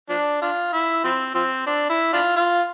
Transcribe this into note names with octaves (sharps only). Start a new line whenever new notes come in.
F3 D4
D4 F4
E4
F3 C4
F3 C4
D4
E4
D4 F4
F4